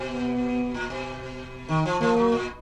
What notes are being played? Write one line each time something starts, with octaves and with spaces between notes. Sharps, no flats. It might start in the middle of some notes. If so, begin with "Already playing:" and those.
Already playing: B2
B3
A#2
B2
D#3
F3
F3 A#3
F#3
A#2